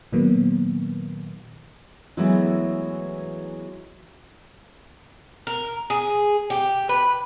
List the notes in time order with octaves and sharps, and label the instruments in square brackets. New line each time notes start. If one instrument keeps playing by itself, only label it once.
[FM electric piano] A#2 D#3 F#3 A#3 B3
[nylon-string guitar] E3 F#3 G#3 A3 B3 E4
[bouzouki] A#4
G#4
G4
B4